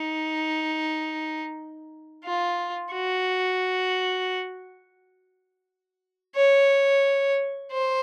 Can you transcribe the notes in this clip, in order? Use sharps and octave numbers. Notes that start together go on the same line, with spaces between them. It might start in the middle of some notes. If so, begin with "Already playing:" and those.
Already playing: D#4
F4
F#4
C#5
C5